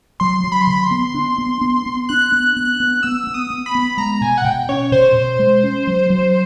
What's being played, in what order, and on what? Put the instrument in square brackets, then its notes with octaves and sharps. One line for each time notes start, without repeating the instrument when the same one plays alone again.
[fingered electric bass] F#3 [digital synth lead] C6
[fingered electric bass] F#3
[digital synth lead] B5
C6
[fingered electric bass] D3 [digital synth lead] B5
[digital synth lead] C6
[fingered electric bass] B3
D4
B3
B3
B3
[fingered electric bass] D4 [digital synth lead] F#6
[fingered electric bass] B3
[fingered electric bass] B3 [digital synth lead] F#6
[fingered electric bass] B3
[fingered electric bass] B3 [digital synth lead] E6
[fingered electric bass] B3
[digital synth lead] D#6
[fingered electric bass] B3
[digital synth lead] B5
[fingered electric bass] B3
[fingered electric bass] G#3 [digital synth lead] A#5
[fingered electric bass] B2 [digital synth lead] G#5
[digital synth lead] F#5
[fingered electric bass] B2 [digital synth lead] G5
[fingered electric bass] C#4 [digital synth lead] C#5
[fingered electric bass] B2 [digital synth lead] C5
[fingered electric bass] B2
G#3
C#4
F#3
F#3